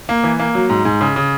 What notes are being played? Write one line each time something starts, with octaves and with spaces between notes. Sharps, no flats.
A#3
E3
A#3
F#3
G#2
G#2
C#3
C#3